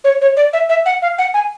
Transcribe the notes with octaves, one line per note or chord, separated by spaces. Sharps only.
C#5
C#5
D5
E5
E5
F#5
F5
F#5
G#5